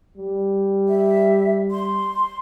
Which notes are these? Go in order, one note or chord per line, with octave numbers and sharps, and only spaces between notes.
G3
E5
C6